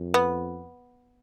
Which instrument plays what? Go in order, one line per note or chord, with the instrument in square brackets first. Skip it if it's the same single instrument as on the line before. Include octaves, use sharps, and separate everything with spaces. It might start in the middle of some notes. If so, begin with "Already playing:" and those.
Already playing: [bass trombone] F2
[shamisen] B3